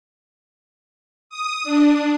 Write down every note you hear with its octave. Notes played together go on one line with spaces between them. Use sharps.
D#6
D4